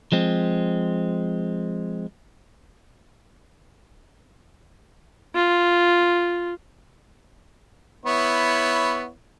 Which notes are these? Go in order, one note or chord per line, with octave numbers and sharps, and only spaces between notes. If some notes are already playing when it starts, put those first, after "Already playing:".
F3 G#3 C4
F4
B3 E4 C#5